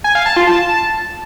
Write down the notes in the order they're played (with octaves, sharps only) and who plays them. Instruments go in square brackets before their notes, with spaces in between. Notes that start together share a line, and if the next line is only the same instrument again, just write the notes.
[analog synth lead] G#5
F5
A5
F4
A5